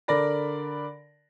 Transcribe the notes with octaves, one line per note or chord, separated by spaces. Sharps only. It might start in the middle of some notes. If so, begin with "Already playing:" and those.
D3 A#4 D5 B5 A#6